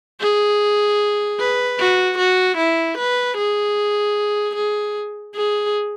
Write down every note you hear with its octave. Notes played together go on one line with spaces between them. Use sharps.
G#4
B4
F#4
F#4
E4
B4
G#4
G#4
G#4